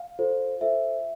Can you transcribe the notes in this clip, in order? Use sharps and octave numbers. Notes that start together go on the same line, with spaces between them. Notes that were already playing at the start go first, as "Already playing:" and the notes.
Already playing: F5
F4 A4 C5
F4 A4 C5 E5